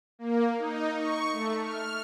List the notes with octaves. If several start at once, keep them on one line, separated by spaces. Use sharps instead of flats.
A#3
D#4
C#6
A3
F6